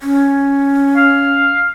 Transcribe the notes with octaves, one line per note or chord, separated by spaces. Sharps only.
C#4
F5